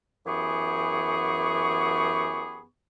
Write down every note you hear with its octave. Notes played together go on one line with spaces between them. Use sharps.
F#2 E3 B3 G4 G#4 C#6